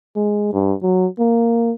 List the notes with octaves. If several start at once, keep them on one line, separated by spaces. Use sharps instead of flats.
G#3
G2
F#3
A#3